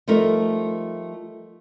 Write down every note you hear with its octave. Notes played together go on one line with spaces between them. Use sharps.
F3 G3 A3 D#4 A#4